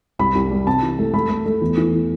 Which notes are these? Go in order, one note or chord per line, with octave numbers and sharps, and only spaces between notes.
C2 B5
C2
G3
C3 A5
E3
A3
A3 B5
A3
A3
E2
E3